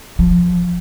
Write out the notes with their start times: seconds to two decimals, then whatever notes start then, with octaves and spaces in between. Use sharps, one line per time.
0.19 F3